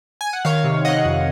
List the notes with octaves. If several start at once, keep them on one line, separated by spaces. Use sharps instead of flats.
G#5
F#5
D#3 C#5 F5
C3
C3 D#5 F#5
F2